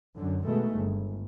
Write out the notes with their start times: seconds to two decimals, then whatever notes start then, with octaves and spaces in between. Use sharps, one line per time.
0.16 F#2 D3
0.46 B2 D#3 G#3 A3
0.76 G1